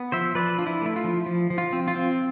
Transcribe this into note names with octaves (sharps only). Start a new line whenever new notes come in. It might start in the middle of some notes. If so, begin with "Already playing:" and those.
Already playing: B3
F3 C5 E5
F3 B4 D5
D4 F4
E4
A3 E4
F4
F3
F3
F3
F4
C4
F4
C4